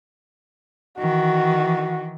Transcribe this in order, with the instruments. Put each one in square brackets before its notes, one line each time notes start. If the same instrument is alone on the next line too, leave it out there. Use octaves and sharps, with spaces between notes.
[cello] D#3 E3 [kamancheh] F#4